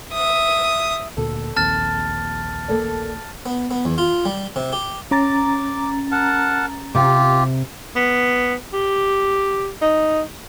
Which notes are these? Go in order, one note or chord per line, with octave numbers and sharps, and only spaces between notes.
E5 D#6
D2 A#2 A4
A#1 D#2 C4 A5 F6 A6
A#3 A4 D5
B3
B3
E2
F4
G3
C3
G4
C#4 A#5 D6 A6
A#4 F#5 A5
C3 F4 G4
B3
G4
D#4